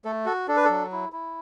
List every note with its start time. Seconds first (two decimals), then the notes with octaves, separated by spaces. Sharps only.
0.05 A3 A4
0.26 F#4 A4
0.48 D4 A4
0.57 B4
0.65 F#3 A4
0.92 E4
1.12 E4